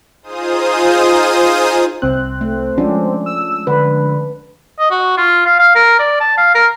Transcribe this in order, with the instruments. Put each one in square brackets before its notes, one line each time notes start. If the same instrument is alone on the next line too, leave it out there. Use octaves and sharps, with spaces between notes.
[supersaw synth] D#4 F4 G#4 C5 D#6
[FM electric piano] C2 F#6 [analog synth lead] C4
[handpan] A3
[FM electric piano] F3 G#3 [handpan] C#4 D4
[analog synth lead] E6
[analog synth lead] D3 [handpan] B4
[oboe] D#5
F#4
F4
F5
F5
A#4
D5
A5
F5
A#4